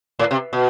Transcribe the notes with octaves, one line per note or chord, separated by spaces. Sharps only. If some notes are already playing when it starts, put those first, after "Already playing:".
A2
C3
B2